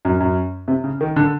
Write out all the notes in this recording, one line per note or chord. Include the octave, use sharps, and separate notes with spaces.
F#2
F#2
C3
C#3
D#3
D3